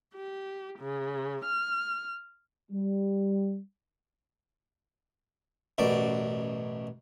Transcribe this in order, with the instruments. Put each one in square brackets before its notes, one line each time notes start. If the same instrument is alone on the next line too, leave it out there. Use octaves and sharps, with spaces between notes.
[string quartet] G4
C#3
F6
[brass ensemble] G3
[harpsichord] A1 F#2 B2 D5